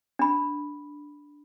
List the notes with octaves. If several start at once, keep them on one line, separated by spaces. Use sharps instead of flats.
D4 B5